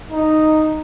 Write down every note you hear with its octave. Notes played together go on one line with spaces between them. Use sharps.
D#4